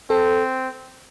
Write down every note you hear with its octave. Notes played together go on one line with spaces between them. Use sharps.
C4 A4